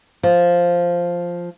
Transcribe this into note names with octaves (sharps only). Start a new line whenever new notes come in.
F3